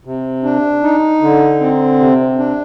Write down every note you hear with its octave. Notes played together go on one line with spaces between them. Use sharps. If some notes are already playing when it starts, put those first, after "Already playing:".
C3
D4
D#4
D3
C4
C3
D4